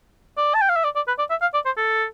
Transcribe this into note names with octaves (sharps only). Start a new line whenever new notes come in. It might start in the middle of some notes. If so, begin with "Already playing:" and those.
D5
A5
G5
F5
E5
D5
D5
B4
D5
E5
F5
D5
C5
A4